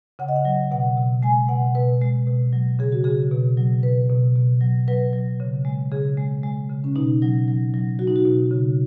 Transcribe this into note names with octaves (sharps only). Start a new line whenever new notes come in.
C#3 F#5
D#5
F#5
F#3
B2 F#5
B2
G#3 G#5
B2 F#5
B2 B4
G#3
B2
F#3
C#3 G#4
F#4
C#3 G#4
B2
F#3
B2 B4
B2
B2
F#3
F#3 B4
F#3
C#3
G#3
C#3 G#4
G#3
G#3
C#3
C#4
B2 D#4
F#3
F#3
F#3
F#3 F#4
D#4
F#4
B2
C#3